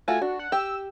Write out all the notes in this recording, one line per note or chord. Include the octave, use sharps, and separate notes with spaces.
A3 F4 F#4 G#5
D4 F#4
F#5
G4 E6